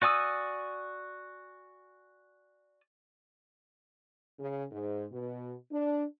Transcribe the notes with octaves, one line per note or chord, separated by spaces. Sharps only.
F#4 D5 G#5 D#6 E6
C#3
G#2
B2
D4